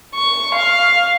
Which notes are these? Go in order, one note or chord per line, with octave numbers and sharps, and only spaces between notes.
C#6
F5